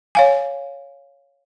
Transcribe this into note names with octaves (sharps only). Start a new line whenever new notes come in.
C#5 F5 G#5